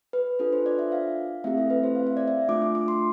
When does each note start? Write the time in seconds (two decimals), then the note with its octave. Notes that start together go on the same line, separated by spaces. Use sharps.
0.13 B4
0.39 D4 F4 A4 B4
0.52 C5
0.66 D5
0.79 E5
0.92 F5
1.44 A3 C4 E4 G4 E5
1.58 A4
1.70 B4
1.83 C5
1.96 F5
2.07 E5
2.17 D5
2.28 E5
2.48 A3 D4 F4 D6
2.62 D6
2.75 D6
2.88 C6